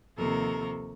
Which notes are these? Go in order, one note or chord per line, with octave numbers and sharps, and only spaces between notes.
D#2 C3 F3 A4 A#4 C#6